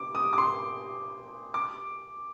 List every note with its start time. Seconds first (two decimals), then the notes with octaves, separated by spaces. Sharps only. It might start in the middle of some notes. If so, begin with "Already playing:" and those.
Already playing: D6
0.15 D#6
0.33 D6
0.38 C6
1.54 D6